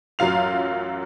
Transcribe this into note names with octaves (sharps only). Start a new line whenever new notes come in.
A1 F#2 F#3 F4 F5 F7